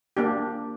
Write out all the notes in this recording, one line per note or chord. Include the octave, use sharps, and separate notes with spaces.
A#3 D4 G4